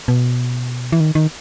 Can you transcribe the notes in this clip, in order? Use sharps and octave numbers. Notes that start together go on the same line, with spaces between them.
B2
E3
D#3
D#3